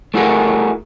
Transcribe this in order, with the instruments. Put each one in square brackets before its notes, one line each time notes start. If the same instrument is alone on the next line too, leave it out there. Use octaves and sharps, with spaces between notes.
[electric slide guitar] A3 E4 F#4 G#4 A#4